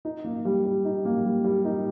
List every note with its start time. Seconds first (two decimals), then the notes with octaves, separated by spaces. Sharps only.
0.05 D#4
0.24 A#3
0.45 G3
0.65 G3
0.85 D#4
1.05 A#3
1.24 G3
1.44 G3
1.65 D#4